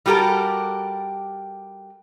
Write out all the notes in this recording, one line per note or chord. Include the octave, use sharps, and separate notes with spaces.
G3 F#4 G4 A4 A#4